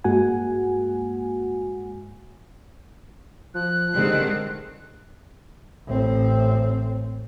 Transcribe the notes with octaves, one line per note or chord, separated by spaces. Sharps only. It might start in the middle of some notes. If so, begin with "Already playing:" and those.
G2 G#3 A#3 F#4 F#5 G#5
F3 F#6
D3 D#3 G3 G#3 C4
A1 C4